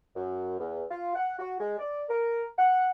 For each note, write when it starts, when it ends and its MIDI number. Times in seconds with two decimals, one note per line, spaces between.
0.16 0.56 42
0.58 0.83 40
0.91 1.15 65
1.15 1.34 78
1.39 1.56 66
1.60 1.78 56
1.79 2.04 74
2.09 2.44 70
2.58 2.89 78